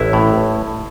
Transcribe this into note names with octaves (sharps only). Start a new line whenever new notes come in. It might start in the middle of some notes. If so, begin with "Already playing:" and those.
Already playing: A1 E4
A2